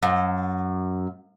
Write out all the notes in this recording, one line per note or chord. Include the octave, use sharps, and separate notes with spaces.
F#2